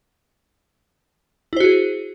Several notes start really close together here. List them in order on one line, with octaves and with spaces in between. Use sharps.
E4 C5 F#4 G#4